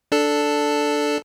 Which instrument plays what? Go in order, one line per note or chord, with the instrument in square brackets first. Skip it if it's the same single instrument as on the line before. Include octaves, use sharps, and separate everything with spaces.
[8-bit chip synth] D4 A4